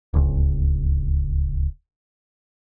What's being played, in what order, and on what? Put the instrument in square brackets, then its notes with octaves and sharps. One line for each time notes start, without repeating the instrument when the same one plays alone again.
[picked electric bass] D1 C#2